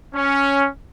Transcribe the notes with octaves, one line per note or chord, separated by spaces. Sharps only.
C#4